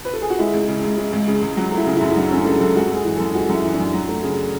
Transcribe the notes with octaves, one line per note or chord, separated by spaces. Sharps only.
B4
A4
G#4
F#4
G#3 E4
C#2
C#3
C#2
G#3
C#2
C#3
C#2
F#3
A3
E4
C#3
F#2 E4
E4
F#3 D4
A3 C#4
C#3 A4
F#2 A4
G#3 F#4
F#2 G#4
E3
F#2 A4
G#3 F#4
F#2 E4
E3
D4
F#2
F#3
A3
C#3